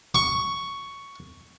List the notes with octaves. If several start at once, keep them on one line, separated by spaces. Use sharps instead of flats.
C#6